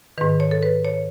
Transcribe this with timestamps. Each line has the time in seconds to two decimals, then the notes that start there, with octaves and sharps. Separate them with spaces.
0.18 D#3 B4
0.21 G#2
0.40 C#5
0.51 A4
0.62 B4
0.85 C#5